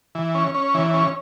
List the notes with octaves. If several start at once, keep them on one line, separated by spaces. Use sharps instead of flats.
E3
C#4
C#4
E3
C#4